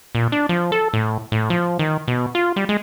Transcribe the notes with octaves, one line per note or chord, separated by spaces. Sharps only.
A#2
D4
F3
A4
A2
A2
F3
D#3
B2
F4
G3
G#3